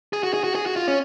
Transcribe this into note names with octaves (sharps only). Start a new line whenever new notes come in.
G#4
F#4
G#4
F#4
G#4
F#4
F4
C#4